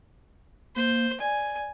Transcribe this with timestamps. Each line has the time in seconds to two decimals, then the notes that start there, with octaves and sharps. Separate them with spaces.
0.76 A#3 C5
1.20 D5 G#5